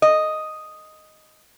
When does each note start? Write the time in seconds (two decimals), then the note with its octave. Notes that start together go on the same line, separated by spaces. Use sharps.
0.02 D#5